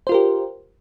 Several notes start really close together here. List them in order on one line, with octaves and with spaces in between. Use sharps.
C5 F4 A#4 G4